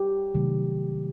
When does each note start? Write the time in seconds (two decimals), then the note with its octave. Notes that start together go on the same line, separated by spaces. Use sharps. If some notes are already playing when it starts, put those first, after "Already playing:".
Already playing: G4
0.34 C3 D#3 F#3 A3